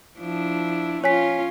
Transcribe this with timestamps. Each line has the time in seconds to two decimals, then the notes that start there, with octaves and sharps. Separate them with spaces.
0.19 F3 D4 E4
1.04 C#4 F4 C#5 G#5 B6